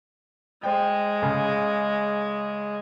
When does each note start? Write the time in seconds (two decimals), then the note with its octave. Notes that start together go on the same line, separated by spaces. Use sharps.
0.63 G#3 C5 G5
1.22 C#3